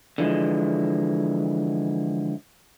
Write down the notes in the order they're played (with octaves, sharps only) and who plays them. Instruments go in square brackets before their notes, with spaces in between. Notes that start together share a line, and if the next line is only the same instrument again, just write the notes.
[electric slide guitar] D3 E3 F3 G#3